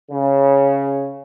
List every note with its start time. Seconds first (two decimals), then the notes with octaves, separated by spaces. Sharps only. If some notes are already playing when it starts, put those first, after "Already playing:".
0.11 C#3